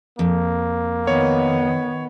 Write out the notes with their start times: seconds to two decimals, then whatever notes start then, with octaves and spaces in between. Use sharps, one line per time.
0.19 F2 A#3
1.07 D#3 B3 C#5